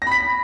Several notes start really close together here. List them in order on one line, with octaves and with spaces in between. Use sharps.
A#6 B5 B6